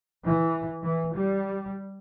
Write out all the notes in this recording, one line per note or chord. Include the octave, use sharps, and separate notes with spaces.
E3
E3
G3